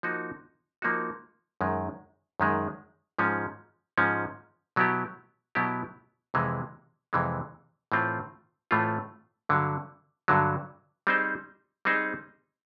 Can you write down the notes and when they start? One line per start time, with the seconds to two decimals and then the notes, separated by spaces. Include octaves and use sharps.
0.03 F3 A#3 D#4 F#4
0.82 F3 A#3 D#4 F#4
1.61 F#2 D#3 G#3
2.40 F#2 D#3 G#3
3.19 G#2 F3 G#3 C#4
3.98 G#2 F3 G#3 C#4
4.76 B2 F#3 B3 E4 G4
5.55 B2 F#3 B3 E4 G4
6.34 F2 C3 E3 G#3
7.13 F2 C3 E3 G#3
7.92 A2 E3 A3 C4 F4
8.71 A2 E3 A3 C4 F4
9.49 G2 D3 F#3
10.28 G2 D3 F#3
11.07 G3 C4 D#4 G#4 C5
11.85 G3 C4 D#4 G#4 C5